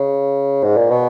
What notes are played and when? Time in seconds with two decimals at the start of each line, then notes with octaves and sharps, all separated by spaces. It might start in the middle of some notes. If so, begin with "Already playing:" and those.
Already playing: C#3
0.63 G#2
0.77 A#2
0.91 B2